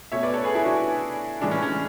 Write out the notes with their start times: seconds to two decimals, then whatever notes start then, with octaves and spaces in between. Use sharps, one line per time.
0.12 B2 A3 C#4 C#5 E5
0.23 B4 D5
0.34 A4 C#5
0.44 G#4 B4
0.55 E4 G#4
0.65 D4 F#4
1.41 A2 E3 G#3 C#4 D4
1.51 C#4
1.62 C#4